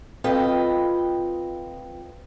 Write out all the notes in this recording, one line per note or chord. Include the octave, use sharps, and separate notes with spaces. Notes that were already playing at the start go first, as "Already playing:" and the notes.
C4 F4 A4 B4 D#5 G5